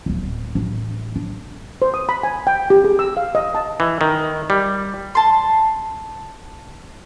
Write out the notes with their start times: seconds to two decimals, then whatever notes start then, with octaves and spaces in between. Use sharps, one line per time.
0.06 D1 G#1
0.55 A1 D4
1.16 D4
1.82 C5
1.94 D#6
2.09 B5
2.23 G#5
2.47 G5
2.70 G4
2.84 G#4
2.99 E6
3.17 F5
3.35 D#5
3.55 A5
3.80 E3
4.01 D#3
4.50 G3
5.15 A5 C6